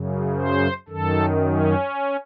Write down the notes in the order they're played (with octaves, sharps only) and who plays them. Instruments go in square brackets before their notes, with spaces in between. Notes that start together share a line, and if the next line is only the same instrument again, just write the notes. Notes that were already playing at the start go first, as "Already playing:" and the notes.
Already playing: [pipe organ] F#2 C#3
C5
F#2 D#3 A4
C#4